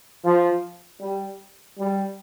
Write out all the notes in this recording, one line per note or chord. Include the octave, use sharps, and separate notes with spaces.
F3
G3
G3